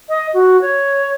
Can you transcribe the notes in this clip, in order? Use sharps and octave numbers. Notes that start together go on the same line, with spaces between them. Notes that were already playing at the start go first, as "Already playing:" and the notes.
D#5
F#4
C#5